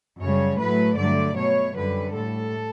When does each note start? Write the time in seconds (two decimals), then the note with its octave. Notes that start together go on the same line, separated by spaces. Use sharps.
0.20 F#2 C#3 G3 C#5
0.58 A2 F#3 A3 B4
0.97 G2 D3 F#3 A3 D5
1.36 B2 A3 C#5
1.75 F#2 D3 G3 B4
2.14 A2 G3 A4